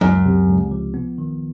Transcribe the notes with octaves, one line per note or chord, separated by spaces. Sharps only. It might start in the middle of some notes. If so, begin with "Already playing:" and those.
C#2 F#2
C3
C#2
F3
B3
D#3